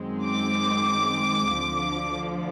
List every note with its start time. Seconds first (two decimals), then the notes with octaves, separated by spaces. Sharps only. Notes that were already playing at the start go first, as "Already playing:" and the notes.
Already playing: F#2 D#3 G#3 C4
0.25 D6
1.52 D2 D3 F3